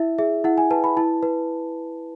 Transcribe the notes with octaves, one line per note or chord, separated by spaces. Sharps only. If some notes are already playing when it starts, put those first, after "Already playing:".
Already playing: E4 E5
G#4 E5
E4 F#5
G#5
B4 A5
B5
E4 A5
B4